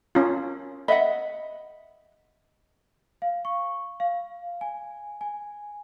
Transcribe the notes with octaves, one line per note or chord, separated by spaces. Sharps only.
C#4 F4 A#4
D#5 E5 F#5 B5
F5
C#6
F5
G#5
G#5